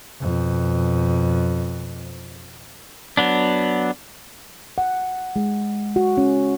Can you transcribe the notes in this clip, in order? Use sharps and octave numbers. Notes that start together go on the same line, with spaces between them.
F2 B2
F#3 B3 D4
F#5
G#3
F#4
C#4